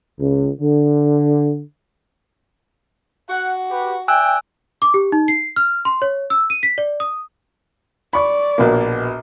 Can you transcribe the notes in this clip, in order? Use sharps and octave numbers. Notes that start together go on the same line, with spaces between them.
C#2
D3
F#4 F#5
G4 B4
D5 E5 G5 G#5 E6 F#6
D6
G4
D#4
C7
F6
C6
C#5
E6
D#7
B6
D5
D#6
D5 B5 C#6
A#1 B2 A#3